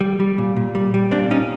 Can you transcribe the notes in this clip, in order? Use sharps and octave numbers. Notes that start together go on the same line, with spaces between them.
G3
G3
A#2
A#2
G3
G3
A#2 C4 D4
A#2 C#4 D#4